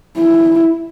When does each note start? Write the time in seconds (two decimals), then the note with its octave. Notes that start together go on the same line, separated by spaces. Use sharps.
0.18 E4